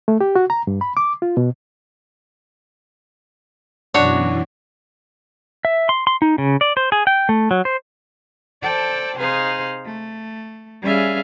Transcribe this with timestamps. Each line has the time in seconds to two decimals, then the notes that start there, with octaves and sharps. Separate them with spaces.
0.08 A3
0.21 G4
0.36 F#4
0.50 A#5
0.67 G2
0.81 B5
0.97 D6
1.22 F4
1.37 B2
3.94 F#2 B2 E3 D4 F#4 C#5
5.65 E5
5.89 C6
6.07 C6
6.22 D#4
6.38 C#3
6.61 D5
6.77 C5
6.92 G#4
7.07 G5
7.29 A3
7.51 F#3
7.65 C5
8.63 A4 C5 D5 G5 A5
9.20 C3 D#4 G#4 C5 F5
9.87 A3
10.84 G3 C#4 G#4 E5 F5